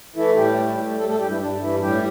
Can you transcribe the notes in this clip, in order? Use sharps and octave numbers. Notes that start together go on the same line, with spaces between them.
E3 A3 E4
A2 G3 G4
A3
A3
G3 A3 A4
A3 A4
G2 G3 G4
E3 E4
G2 D4
G2 E3 E4
A2 G3 G4